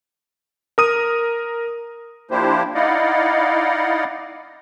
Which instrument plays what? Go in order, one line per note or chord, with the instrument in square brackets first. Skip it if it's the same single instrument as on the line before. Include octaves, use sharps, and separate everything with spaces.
[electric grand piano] A#4 D#6 D#7
[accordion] F3 A#3 D4 E4 G4 C5
D#4 E4 D5 D#5 F5 F#5